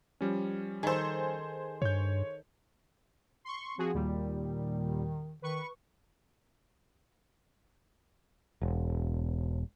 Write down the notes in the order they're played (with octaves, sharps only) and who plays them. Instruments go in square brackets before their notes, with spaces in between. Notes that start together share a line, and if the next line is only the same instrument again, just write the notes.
[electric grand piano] F3 G3 C#4
[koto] D#3 A4 [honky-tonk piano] G#4 C5
[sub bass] G2 [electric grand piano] C#5 G6
[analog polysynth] C6 C#6
[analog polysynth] F3 F#4 G#4 [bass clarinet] C4
[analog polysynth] D#2 A#2 G3 [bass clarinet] D#3
[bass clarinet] D#3 [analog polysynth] B4 C#6
[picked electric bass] E1